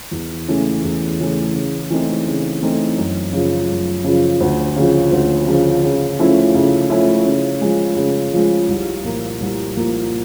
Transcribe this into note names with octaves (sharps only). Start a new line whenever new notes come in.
E2
C#3 E3 A3 C#4
E2
C#3 E3 A3 C#4
C#3
E3 A3 C4 D#4
C#3
E3 A3 C4 D#4
F#2
C#3 F3
F#2
C#3 F3
D2
C#3 F3
D2
C#3 F3
C#3
F3 A3 C#4 E4
C#3
F3 A3 C#4 E4
C#3
F3 G#3
C#3
F3 G#3
C2
A#2 F3 A#3
C2
A#2 F3 A#3